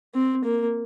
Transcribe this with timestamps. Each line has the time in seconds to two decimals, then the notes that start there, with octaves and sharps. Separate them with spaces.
0.14 C4
0.44 A#3